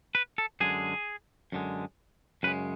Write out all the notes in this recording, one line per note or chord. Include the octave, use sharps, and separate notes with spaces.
B4
A4
F#2 D3 G#3 G#4
F#2 D3 G#3
F#2 C#3 G#3 B4